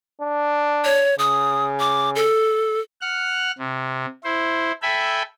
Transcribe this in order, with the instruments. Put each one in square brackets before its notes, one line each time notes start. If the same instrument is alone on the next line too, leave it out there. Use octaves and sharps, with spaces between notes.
[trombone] D4
[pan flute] C#5
[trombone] C#3 [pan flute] D#6
[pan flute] D6
A4
[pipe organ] F#5 F6 F#6
C3
E4 C5
A4 E5 G5 G#5 B5